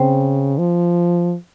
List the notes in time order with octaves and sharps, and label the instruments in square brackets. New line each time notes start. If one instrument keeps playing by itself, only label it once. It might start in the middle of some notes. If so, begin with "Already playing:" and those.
Already playing: [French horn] C#3 [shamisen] C4
[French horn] F3